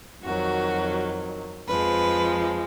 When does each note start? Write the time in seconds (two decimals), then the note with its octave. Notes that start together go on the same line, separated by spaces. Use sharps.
0.23 F2 D#3 F#3 F#4
1.68 F2 F3 G#3 B4